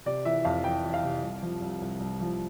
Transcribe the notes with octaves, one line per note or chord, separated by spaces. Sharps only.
C3 D5
E3 E5
F2 F5
E3 G5
E3
F5
C3
C2
F3
C2
C2
C2
F3